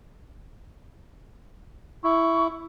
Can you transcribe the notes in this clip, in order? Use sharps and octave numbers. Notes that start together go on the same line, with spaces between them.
E4 C#6